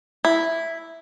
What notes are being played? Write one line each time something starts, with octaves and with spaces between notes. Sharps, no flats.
E4